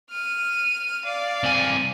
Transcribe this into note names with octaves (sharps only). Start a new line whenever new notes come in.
F6 D#7
D5 F5
C2 G#5